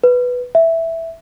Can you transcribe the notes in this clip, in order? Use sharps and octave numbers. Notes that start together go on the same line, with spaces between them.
B4
E5